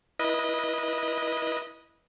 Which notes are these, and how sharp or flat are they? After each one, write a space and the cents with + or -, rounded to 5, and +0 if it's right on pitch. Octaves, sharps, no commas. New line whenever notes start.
E4 +0 B4 -30 D#5 +0